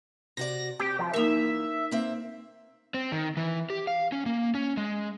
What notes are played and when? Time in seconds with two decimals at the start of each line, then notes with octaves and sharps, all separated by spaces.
0.37 C3 F#4 D5 A#6
0.80 C4 G4
0.99 F3
1.13 E3 A#3 D#4 A#4 E5
1.91 A#3 C4 E5
2.94 C4
3.12 D#3
3.37 E3
3.70 G4
3.87 F5
4.12 C#4
4.26 A#3
4.55 C#4
4.77 G#3